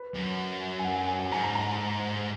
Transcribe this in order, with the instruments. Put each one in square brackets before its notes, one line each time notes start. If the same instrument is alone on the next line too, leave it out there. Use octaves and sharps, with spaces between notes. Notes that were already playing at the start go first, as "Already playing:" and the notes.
Already playing: [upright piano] B4
[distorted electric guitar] F#2
[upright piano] G#5
F#5
F#5
G#5
G#5
[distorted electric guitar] G#2 [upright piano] A#5
[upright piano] A#5
A#5